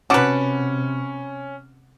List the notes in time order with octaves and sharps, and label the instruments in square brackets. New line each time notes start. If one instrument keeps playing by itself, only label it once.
[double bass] C3 [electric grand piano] C#4 [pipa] F#4 B4 [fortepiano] F#5 A5 D6